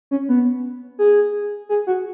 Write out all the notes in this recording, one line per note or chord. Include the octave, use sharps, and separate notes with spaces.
C#4
B3
G#4
G#4
F#4